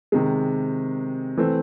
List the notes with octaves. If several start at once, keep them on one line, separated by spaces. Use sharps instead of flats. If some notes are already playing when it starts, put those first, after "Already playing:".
C3 D#3 G#3
E3 A3 C4